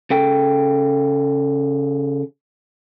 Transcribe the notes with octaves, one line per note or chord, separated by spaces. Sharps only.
C#3 A4 G5